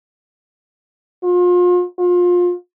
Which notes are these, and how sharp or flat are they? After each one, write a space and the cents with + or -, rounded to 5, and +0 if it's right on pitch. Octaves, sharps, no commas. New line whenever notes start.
F4 +35
F4 +25